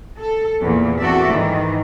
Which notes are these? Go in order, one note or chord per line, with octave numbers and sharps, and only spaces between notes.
A4
E2 A#2
E2 C4 F#4 A4 D5 E5
G#2 D#3 E3